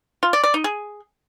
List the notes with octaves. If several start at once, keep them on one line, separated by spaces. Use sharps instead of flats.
F4
D5
D5
D#4
G#4